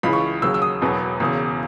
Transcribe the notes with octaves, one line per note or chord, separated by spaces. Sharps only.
C#2 C#3 E3 B5
C#6
D#2 C#3 F#3 E6
E6
D#6
E1 E2 B2 F#3 B3
E1 E2 C#3